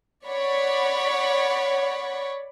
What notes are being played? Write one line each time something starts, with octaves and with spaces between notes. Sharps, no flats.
C#5 D5 F#5 B5 C#6